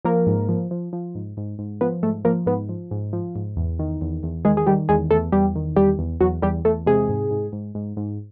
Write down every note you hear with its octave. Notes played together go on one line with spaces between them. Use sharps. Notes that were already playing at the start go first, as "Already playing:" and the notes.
F3 A#3 A#4
G#2
F3
F3
F3
G#2
G#2
G#2
F3 B3 B4
G#2 A3 A4
F3 A#3 A#4
G#2 B3 B4
F3
G#2
F3
G#2
E2
D#3
E2
E2
D#3 G#3 G#4
G#4
D#3 G3 G4
E2 G#3 G#4
E2 A3 A4
E2 G3 G4
D#3
E2 G3 G4
E2
E2 F#3 F#4
E2 G3 G4
E2 A3 A4
C3 G#3 G#4
G#2
G#2
G#2
G#2
G#2